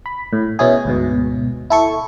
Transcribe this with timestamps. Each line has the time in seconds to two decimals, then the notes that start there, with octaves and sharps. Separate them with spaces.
0.06 B5
0.33 A2
0.59 B2 C#4 E4 G#4
0.85 D2 G#2 B2
1.70 E4 A4 C#6